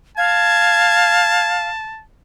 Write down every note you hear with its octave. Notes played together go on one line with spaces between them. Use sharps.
F5 A5 G#6